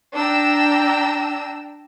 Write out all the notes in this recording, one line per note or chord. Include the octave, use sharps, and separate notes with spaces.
D4 G5 A#5 E6